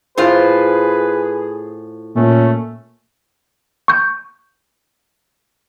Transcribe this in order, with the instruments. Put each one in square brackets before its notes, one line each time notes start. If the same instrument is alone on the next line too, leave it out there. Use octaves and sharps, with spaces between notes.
[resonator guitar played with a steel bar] A2 F4 C5 [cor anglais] G#4 [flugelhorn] B4
[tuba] A#2 [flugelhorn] A3 [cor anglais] C#4
[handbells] C#6 G6